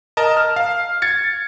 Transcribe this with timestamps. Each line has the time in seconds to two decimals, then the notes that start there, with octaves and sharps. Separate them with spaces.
0.17 A#4 D#5 A5
0.37 F6
0.56 F5
1.02 G#6 A6 C#7